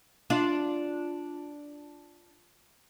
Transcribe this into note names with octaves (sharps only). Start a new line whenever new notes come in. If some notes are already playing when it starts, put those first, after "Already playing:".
D4 F4